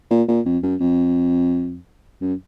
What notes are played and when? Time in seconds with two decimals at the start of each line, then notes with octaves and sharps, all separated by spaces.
0.11 A#2
0.28 A#2
0.46 F2
0.63 F#2
0.80 F2
2.21 F#2